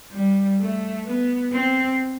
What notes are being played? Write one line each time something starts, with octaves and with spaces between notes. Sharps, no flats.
G3
A3
B3
C4